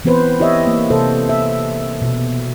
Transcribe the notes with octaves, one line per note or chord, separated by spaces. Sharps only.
E3 B3 C4 B4 C5
E4 G4 C#5 D#5 E5
A#3
C3 A4 C5
E5
B2